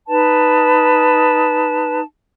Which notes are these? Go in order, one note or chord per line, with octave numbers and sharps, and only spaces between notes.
D#4 B4 A5